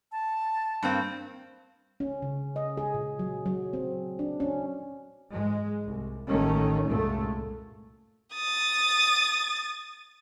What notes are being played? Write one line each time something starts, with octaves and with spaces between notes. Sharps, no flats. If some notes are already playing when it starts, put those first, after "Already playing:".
A5
G2 A#3 C4
C#4
C#3
D#5
G#4
A#2
F#3
F#3
C4
D4
C#4
G#2 G#3
C2
A1 D#3 A3 A#3 C#4
C2 F#2 A#2 G#3 A3
D#6 A6